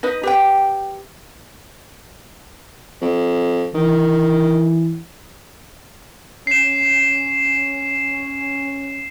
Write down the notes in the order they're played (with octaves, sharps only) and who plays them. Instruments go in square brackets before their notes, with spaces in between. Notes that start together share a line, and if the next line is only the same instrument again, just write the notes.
[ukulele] D#4 B4 D#5
G4 B4 G5
[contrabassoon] F2
[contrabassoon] D#3 [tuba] E3
[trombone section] C#4 [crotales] C7 E7